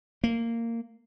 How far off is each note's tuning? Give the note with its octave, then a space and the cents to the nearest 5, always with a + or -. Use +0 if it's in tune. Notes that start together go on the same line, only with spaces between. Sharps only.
A#3 -15